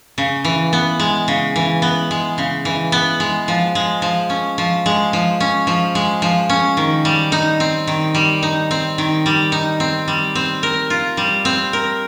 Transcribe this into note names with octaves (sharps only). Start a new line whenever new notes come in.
C#3
E3
B3
G#3
C#3
E3
B3
G#3
C#3
E3
B3
G#3
F3
G#3
F3
C#4
F3
G#3
F3
C#4
F3
G#3
F3
C#4
D#3
G3
D#4
C4
D#3
G3
D#4
C4
D#3
G3
D#4
C4
G3
C4
A#4
F4
G3
C4
A#4